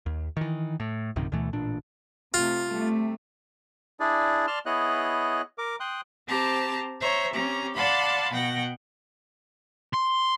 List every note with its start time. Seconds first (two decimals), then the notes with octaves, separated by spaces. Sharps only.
0.06 D#2
0.37 D#3 E3
0.80 A2
1.16 A#1 F#2 C3 D#3
1.32 D2 B2 E3 A3
1.53 A1 A#2 D4
2.34 C3 A3 F4
2.67 C3 G3 A3
4.00 D4 E4 G#4 D5
4.47 D5 A5 C6 F6
4.66 B3 E4 G#4 C#5 D#5 F#6
5.58 A#4 D6
5.80 G5 C6 D#6 F#6
6.28 C4 G4 C5 A5 A#5
7.00 C5 C#5 E5 A#5
7.33 C4 C#4 G4 A#5
7.75 D5 F5 F#5 A5 B5 C6
8.32 B2 F#5 G5 A#6
9.93 C6